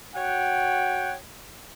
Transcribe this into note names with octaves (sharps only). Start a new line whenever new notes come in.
F#4 C#5 F#5 G5